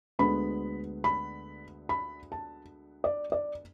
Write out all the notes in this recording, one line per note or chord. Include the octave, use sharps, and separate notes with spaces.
D2 D3 G#3 B3 B5
B5
B5
A5
D5
D5